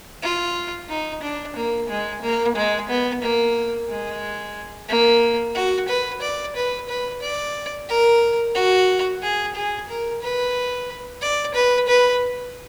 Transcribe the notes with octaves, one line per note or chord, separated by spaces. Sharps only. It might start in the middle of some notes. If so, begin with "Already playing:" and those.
F4
D#4
D4
A#3
G#3
A#3
G#3
B3
A#3
G#3
A#3
F#4
B4
D5
B4
B4
D5
A#4
F#4
G#4
G#4
A#4
B4
D5
B4
B4